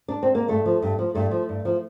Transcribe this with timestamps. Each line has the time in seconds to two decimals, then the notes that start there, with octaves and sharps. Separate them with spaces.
0.08 D4
0.23 C4
0.35 A#3
0.48 G2 A3
0.66 F3
0.82 G2
0.99 F3
1.15 G2 A3
1.31 F3
1.49 G2
1.65 F3